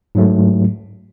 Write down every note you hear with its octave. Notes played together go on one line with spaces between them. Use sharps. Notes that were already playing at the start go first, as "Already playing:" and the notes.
G#2 F#3 A3